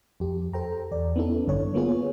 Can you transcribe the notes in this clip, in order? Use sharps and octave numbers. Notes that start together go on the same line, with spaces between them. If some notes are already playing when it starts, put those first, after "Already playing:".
F2 G4
A4 C5 G5 A#5
E2 D5
B3 C#4 D#4 E4 A4
A1 G2 D3 C#5
A#3 B3 F4 G#4 C#5